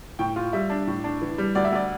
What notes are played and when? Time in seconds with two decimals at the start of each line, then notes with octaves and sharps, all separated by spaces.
0.19 A2 G5
0.36 F4
0.53 G3 E5
0.70 D4
0.87 A2
1.04 D4
1.21 E3
1.38 G3
1.55 D2 D5
1.65 E5
1.72 D2 D5